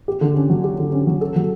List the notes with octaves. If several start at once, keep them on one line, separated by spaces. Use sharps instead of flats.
G4
D3
C#4
F#3
G4
D3
C#4
F#3
A4
F#3